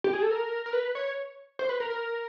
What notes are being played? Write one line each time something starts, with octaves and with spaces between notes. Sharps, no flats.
G4
G#4
A4
A#4
A#4
B4
C#5
C5
B4
A#4
A#4